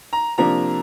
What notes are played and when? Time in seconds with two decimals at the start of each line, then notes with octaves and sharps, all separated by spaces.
0.13 A#5
0.38 C3 F3 A#3 D4 A#5